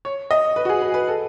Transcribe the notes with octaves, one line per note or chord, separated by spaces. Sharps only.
C#5
D#5
B4
F#4
G#4
B4
B4
A4